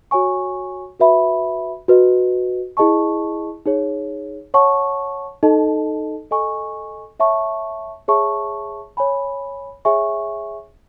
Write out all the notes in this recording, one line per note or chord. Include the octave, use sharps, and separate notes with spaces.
F#4 C#5 G#5 C#6
F#4 B4 E5 B5
F#4 B4 D#5
E4 G#4 D#5 A5 C#6
D#4 G#4 C#5
C#5 F#5 A5 C#6
D#4 A4 D#5 A5
A4 D#5 G#5 C#6
C#5 E5 A5 C#6
G#4 C#5 E5 A5 C#6
C#5 G#5 B5
G#4 C#5 E5 G#5 C#6